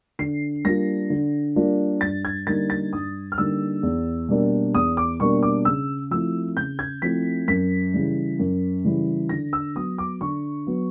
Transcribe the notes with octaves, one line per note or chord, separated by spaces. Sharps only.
D3 C7
G3 A#3 D4 F4 A#6
D3
G3 A#3 D4 F4
G2 A6
G#6
D3 G3 A#3 D#4 A6
A6
G2 D#6
F6
D3 G3 A#3 D#4 E6
E2
B2 G3 A#3 D4
E2 D#6
D6
B2 G3 A#3 D4 C#6
D6
C#3 E6
F3 A3 C4 E4 E6
C#3 G6
G#6
F3 A3 C4 E4 B6
F#2 B6
C#3 E3 G3
F#2
C#3 E3 G3
D3 A#6
E6
F#3 B3 D#6
D6
D3 C#6
F#3 B3